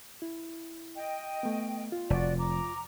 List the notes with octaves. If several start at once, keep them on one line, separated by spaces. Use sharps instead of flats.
E4
D#5 G5
A3 B3
F4
F1 F#4 D5
A#5 D6